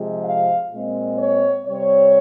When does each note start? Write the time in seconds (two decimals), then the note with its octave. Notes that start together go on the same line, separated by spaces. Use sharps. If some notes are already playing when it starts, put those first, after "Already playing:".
Already playing: C3 F3 G#3 C4
0.25 F5
0.71 A#2 G#3 C4
1.19 C#5
1.66 C3 G3 C4 C#5